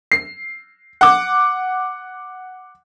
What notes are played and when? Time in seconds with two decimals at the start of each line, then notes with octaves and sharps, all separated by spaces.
0.12 C7
1.01 F#5 D6